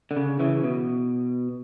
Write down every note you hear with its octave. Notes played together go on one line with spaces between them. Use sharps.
D3
C#3
C#3 E3
B2